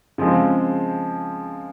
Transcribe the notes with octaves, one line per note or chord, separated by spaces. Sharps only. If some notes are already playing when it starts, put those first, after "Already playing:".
C#3 F3 G#3 C4